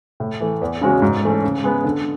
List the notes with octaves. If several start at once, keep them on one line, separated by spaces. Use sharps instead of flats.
A2
E3 A3
E2
C#3 G#3 C#4 F#4
G#2
E3 A3 C#4
C#3
G#3 B3
D3